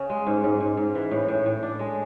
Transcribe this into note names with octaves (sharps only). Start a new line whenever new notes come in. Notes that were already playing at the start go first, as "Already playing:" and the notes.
Already playing: C#3 C#4
G#3
G#2
G#2
G#2
G#2
E3
A2
A2
A2
D4
G#3